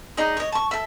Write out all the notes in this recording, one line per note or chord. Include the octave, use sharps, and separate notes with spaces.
D#4 G#4 D5 D#5
C#5 D#5
A5 C#6
A4 E5